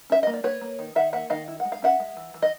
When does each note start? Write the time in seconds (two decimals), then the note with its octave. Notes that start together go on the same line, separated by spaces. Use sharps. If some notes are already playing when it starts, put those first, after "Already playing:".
0.10 C#4 E5
0.23 A#3 D#5
0.34 D5
0.44 A#3 B4 C#5
0.61 A#3
0.79 D#3
0.95 D#3 E5 F#5
1.13 A#3 E5 F#5
1.30 D#3 D#5 F5
1.48 E4
1.60 F#5
1.65 G#3
1.72 F5
1.82 C#4 E5 F#5
2.00 G#3
2.17 E3
2.34 E3
2.42 D#5